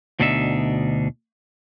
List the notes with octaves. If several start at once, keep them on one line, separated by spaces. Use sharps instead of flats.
D2 B2 D4 D#4 A#4 E5